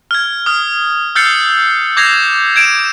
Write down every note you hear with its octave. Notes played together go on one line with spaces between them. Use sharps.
F6 G#6
D#6 F6
E6 F6 G6 A6 C7 C#7
D6 G6 G#6 A#6 C7 F7
G#6 D7 E7